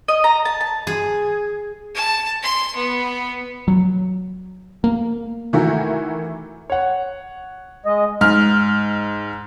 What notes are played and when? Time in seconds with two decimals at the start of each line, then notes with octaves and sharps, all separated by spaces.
0.08 D#5
0.24 A#5
0.45 A5
0.61 A5
0.87 G#4
1.95 A5
2.43 C6
2.76 B3
3.68 F#3
4.84 A#3
5.53 D#3 E3 A3 E4 F#4 A#4
6.70 C#5 F#5
7.86 G#3 D#5
8.21 G#2 F6